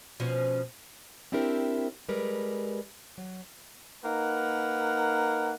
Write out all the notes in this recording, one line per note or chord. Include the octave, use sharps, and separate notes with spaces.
B2 F3 C#4
C4 D4 E4 G4 A#4 C5
G3 G#3 A#4 B4
F#3
A#3 D#4 A#4 B4 F#5